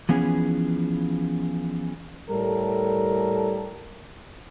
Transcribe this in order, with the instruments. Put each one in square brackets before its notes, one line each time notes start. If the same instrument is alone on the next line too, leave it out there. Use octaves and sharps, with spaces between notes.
[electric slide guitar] E3 F3 B3 C#4 G#4
[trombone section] A2 G3 A4 A#4